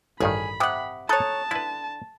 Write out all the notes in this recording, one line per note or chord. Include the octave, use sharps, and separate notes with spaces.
A1 G2 D#3 G#4 B5
C3 F#5 G5 D6 D#6
A4 C#5 A5 A#5 D#6 F#6
D3 E4 B4